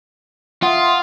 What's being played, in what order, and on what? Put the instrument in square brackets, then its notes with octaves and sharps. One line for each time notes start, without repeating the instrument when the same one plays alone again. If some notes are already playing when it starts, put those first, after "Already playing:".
[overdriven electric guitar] F4 [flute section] E5 C6 D#6 [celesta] F#5